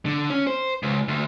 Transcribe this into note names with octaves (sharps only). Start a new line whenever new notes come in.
D3
C#4
C5
C#2
D2